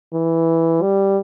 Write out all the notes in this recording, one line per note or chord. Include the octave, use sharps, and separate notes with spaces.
E3
G3